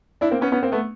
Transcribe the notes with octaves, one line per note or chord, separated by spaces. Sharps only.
D4 E4
A#3 C4
B3 C#4
B3 C#4
A#3 C4
A3 B3